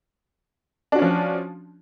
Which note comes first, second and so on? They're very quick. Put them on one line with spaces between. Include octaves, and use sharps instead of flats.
D4 F#4 C#4 F3